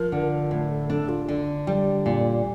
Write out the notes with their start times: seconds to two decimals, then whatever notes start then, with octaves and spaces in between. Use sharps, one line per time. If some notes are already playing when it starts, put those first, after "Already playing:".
Already playing: F3 A#4
0.12 D3
0.51 A2
0.70 A4
0.89 D4 A4
1.09 F4
1.28 D3
1.67 G3
2.06 A#2